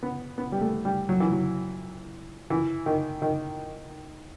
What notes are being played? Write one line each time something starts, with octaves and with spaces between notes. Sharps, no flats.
B3
B3
G3
A3
G3
F#3
E3
F#3
E3
D#3
D#3